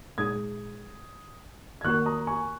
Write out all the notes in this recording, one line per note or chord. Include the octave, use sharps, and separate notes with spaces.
A#2 G#3 D#4 G#4 D#6 G#6
G#6
D#3 A#3 F#4 A#4 C#6 F#6
A#5 D#6
G#5 C#6